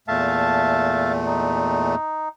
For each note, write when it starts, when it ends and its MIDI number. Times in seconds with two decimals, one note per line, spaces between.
0.08 1.95 40
0.08 1.95 46
0.08 1.95 57
0.08 1.13 76
0.08 1.13 77
0.08 1.13 81
1.26 2.29 63